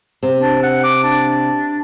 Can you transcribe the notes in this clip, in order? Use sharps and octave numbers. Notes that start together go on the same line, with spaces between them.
C3
D4
F#5
D6
D4